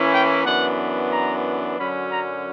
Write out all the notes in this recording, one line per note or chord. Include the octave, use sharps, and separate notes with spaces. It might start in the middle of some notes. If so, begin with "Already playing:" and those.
Already playing: E3 A#3 C#4 E4
G5
F#2 E3 B3 D4 F#5
A#5
F#2 D3 F#3 C#4 B5
A#5